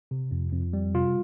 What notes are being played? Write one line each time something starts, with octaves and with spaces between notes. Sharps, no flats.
C3
F2
F2
G3
C3 F4